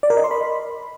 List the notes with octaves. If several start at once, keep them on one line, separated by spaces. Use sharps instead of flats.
D5
A#4
D#5
C6
B5